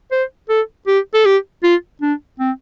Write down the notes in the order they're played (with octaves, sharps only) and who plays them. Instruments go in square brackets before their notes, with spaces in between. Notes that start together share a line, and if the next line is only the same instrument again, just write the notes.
[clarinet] C5
A4
G4
A4
G4
F4
D4
C4